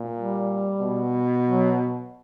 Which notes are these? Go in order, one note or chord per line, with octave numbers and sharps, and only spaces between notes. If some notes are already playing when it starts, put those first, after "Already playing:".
Already playing: A#2
G3
B2
F#3